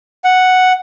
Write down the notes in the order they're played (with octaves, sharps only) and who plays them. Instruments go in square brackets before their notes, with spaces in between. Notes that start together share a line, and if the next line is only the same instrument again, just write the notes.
[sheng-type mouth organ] F#5